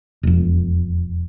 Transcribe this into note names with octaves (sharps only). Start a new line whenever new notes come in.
E1 F2